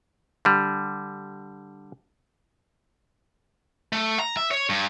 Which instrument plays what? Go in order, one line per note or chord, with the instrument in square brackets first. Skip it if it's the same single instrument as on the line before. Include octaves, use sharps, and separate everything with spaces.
[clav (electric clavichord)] D3 G3
[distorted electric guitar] A3
A#5
E5
C#5
G2